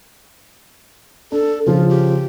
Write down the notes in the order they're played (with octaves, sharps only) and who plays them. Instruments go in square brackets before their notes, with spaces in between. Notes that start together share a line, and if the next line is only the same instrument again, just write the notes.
[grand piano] D4 [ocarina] A4
[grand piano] C#3 F3 [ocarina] F4
[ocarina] G4